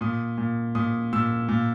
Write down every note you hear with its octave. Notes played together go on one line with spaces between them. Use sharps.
A#2 D#6
A#2
A#2 D#6
A#2 E6
A#2